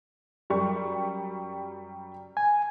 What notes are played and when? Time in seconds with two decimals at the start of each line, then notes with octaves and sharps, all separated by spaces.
0.50 F#2 G3 C#6
2.37 G#5